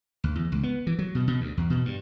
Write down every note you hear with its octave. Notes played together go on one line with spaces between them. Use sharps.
D2
E2
C#2
B3
E3
F#3
B2
B2
D2
E2
B2
G2